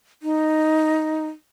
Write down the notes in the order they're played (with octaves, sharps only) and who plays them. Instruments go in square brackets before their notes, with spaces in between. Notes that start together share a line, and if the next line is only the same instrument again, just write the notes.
[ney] D#4